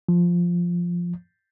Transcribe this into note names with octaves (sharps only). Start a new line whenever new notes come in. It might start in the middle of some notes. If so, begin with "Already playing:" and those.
F3